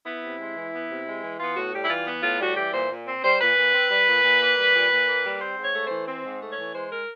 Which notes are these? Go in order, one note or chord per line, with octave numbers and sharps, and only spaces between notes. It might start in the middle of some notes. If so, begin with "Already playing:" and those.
B3 E4
C3
G#3
E3
B3
C3
G#3
E3
B3 F4
A2 F#4
G3 G4
E4
E3 F4
B3
A2 F4
G3 F#4
E3 G4
A#2 C5
A#2
C4
G3 C5
A#2 B4
A#2
C4
G3
A#2
A#2
A#3
G3
A#2
A#2
A#3
G3
C4 C5
G#2
C#5
A3
E3 C5
C4
G#2
A3
C#5
E3
G#3 C5
A#4